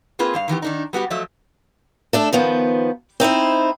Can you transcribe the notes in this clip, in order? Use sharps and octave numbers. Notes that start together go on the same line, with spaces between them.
A#3 C4 F4 G#4 B4
G2 G3 F5
D#3 E3 B3 G4
D#3 D4 D#4
G3 B3 F#4 G4
F3 F#3 A3 D#5 E5
A3 D4 A4
D#3 F3 B3
C4 D#4 E4 C5